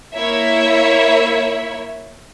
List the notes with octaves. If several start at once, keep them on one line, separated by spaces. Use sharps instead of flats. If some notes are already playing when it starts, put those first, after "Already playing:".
A#3 E4 C#5 E5